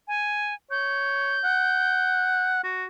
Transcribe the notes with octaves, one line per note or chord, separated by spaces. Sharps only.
G#5
C#5 G6
F#5
F#4